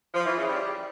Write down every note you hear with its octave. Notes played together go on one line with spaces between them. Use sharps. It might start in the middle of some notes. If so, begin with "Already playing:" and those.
F3
E3
C#3
G3